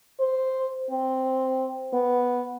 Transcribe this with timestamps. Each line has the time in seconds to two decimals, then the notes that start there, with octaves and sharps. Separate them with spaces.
0.20 C5
0.90 C4
1.93 B3